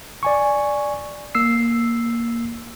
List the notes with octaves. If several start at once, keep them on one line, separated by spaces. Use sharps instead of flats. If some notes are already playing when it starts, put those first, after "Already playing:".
D5 G#5 C#6
A#3 E6 C7